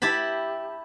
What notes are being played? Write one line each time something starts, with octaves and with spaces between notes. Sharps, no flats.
E4 G4 A5 B5